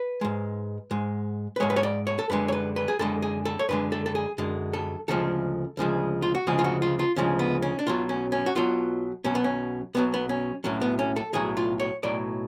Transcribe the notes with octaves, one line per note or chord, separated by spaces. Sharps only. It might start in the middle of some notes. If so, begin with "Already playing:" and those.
Already playing: B4
G#2 G#3
G#2 G#3
B4
G#2 G#3 C#5
B4
C#5
D5
C#5
A4
F#2 D3 G#3 B4
C#5
B4
B4
G#4
F#2 D3 G#3 A4
G#4
A4
C#5
F#2 D3 G#3 B4
A4
A4
G#4
F#2 D3 G#3
A4
D2 C#3 F3 G#3 A4
D2 C#3 F3 G#3
F4
F#4
D2 C#3 F3 G#3 G#4
F4
F#4
F4
F4
D2 C#3 F3 G#3 C#4
B3
C#4
D4
B1 B2 F#3 F4
C#4
C#4
F#4
B1 B2 F#3 F4
B1 B2 F#3 C#4
B3
C#4
B1 B2 F#3 B3
B3
C#4
B1 A2 F#3 C#4
B3
C#4
A4
B1 A2 F#3 G#4
F4
C#5
B1 A2 F#3 D5